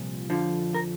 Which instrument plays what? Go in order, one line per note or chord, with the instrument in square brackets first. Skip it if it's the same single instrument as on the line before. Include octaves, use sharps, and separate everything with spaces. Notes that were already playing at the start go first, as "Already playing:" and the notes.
Already playing: [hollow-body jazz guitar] C2 A#2 F3
F2 D3 F3
A#4